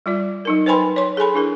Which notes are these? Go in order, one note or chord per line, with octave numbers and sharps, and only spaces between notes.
G3 F4 D5
F#3 D#4 A#4
B4 C5 G5 G#5 B5 C6
C#5 C6
G#4 A4 G#5 B5
D4 E4 G#4 A#4